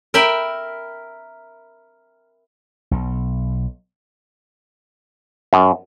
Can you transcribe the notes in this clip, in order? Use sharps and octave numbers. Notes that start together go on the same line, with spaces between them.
A#4 E5 G5 B5
B1
F#2